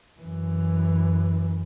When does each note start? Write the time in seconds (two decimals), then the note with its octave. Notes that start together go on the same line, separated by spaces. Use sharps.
0.21 F#2 E3